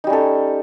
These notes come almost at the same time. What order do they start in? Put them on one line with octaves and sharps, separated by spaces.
D#4 G3 C#4 A4